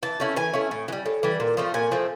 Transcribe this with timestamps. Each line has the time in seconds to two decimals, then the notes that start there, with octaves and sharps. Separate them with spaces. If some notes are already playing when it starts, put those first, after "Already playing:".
0.03 E3 A5
0.20 A3 C#4 E4
0.36 E3 G#5
0.54 A3 C#4 E4
0.71 A2
0.88 E3
0.92 G3
1.06 A2
1.23 E3 G3
1.40 A#2
1.57 F3 A3 C4
1.74 A#2 G#5
1.91 F3 A3 C4